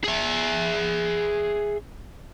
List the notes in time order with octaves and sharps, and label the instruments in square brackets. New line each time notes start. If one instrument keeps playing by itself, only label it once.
[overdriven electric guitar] G#4 E5